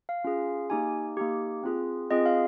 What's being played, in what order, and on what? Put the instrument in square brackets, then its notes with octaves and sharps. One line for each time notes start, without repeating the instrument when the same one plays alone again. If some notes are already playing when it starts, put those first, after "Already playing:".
[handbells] F5
C#4 F4 G#4
A#3 D#4 G4 G#5
A#3 D#4 G4
C4 F4 G#4
C4 F4 G#4 D#5
F5